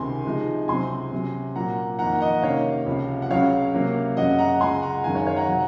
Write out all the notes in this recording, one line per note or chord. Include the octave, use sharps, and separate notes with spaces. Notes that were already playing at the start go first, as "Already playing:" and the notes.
Already playing: C#2 C3 D#3 G#5 C6
C3 F3 G#3 D#4
C#2 C3 F#3 C4 G#5 C6
C3 F#3 C#4
A#2 F#3 A#3 F#5 A#5
F2 D#3 A#3 D#4 F#5 A#5
D#5 F#5
C3 D#3 A#3 C#4 C#5 F5
C#2 C3 F3
F#5
C#2 C#3 F#3 C#5 F5
C3 F#3 A#3 C#4
F#2 C#3 F#3 C#4 D#5 F#5
F#5 A#5
C#2 C#3 G#3 G#5 C6
F#5 A#5
F#2 D#3 G#3 D#4 F5 G#5
C#5 F5
C#5 F5
F#5 A#5
C3 F#3